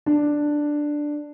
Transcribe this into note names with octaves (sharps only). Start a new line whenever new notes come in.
D4